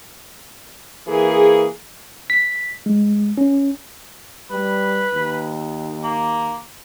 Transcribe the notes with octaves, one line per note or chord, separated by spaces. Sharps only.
E3 A#3 G#4
B6
G#3
C#4
G3 B4
D#2
A#3